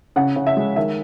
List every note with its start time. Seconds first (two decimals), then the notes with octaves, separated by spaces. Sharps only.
0.16 C#3 F#5
0.36 C#3
0.47 E5
0.57 G#3
0.76 D#3 E5